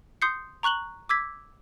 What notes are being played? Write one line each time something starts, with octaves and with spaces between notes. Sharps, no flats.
C6 D#6 G6 C7 C#7
A#5 C#6 F#6 F#7 G7
D6 E6 G#6 B6